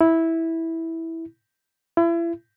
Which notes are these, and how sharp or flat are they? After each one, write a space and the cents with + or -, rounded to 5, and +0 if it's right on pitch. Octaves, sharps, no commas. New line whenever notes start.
E4 -10
E4 +35